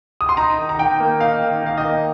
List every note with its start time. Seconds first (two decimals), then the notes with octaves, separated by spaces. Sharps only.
0.21 D#6
0.29 C6
0.37 D#4 A#5
0.58 D#3
0.69 A#5
0.79 D#3 G5
1.00 A#3
1.20 D#4 F5
1.42 D#3
1.63 D#3 F5
1.78 D#5
1.85 A#3